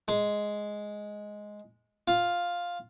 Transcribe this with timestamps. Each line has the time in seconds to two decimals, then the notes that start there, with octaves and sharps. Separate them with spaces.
0.08 G#3
2.08 F4